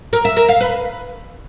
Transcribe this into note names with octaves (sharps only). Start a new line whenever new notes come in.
A#4
E5
A#4
F5
B4